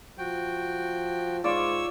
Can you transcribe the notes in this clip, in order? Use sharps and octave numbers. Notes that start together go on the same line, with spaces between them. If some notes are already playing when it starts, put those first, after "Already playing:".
F3 F#4 G5
G#2 F4 C#5 D5 E6